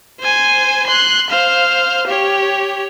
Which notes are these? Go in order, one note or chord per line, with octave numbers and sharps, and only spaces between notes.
C5 G#5
C6 F#6
C5 F5
G4 C#5